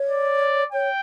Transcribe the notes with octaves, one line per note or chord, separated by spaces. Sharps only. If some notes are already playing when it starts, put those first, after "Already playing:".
Already playing: C#5
D5
C#5 G5